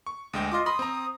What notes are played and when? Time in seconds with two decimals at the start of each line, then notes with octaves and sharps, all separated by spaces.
0.07 C#6
0.33 D2 G#3 G5
0.52 F4 D#5 C6 D6
0.66 B5 C6 D#6 A#6
0.79 C4 A#5